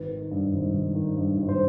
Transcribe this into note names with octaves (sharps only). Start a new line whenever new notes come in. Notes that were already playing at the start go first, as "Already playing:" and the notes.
Already playing: G#1 B4
D#3
G2
G#1
G#1
D#3
G2
G#1
C5